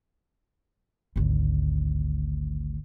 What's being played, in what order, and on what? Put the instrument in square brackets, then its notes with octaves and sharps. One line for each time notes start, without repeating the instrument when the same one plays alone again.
[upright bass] G#1 D2